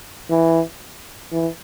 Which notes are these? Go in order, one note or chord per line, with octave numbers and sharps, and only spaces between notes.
E3
E3